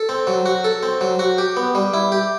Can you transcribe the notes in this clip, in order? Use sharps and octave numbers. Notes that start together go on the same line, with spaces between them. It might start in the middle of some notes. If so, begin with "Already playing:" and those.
Already playing: A4
C4
F#3
F#4
A4
C4
F#3
F#4
G4
B3
G3
E4
G4